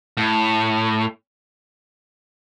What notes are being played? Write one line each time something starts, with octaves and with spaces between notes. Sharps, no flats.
A2